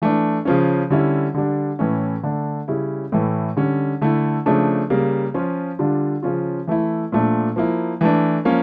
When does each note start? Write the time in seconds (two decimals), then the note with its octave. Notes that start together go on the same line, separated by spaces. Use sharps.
0.02 E3 A3 D4
0.45 C#3 F3 C#4
0.90 D3 G3 C#4 E4
1.34 D3 G3 D4
1.79 A2 E3 A3 C#4
2.23 D3 A3 D4
2.68 C#3 G3 C#4 E4
3.12 A2 E3 A3
3.57 D3 G3 C#4
4.01 D3 A3 E4
4.46 C#3 F3 A3 D4
4.90 C#3 G3 A#3
5.34 F3 C#4 F4
5.79 D3 G3 D4 F4
6.23 C#3 F3 C#4 F4
6.67 E3 A3 E4
7.12 A#2 F3 A3 D4
7.56 F3 A#3 E4
8.01 E3 A3 D4
8.45 F3 A#3 C#4